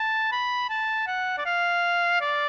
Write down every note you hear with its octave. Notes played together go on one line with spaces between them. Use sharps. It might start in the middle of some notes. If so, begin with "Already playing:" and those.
Already playing: A5
B5
A5
F#5
D5
F5
D5